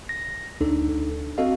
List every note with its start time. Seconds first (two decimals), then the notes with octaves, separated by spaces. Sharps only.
0.09 A#6
0.61 D2 D4 D#4 A4
1.38 C4 F#4 A4 D#5 F5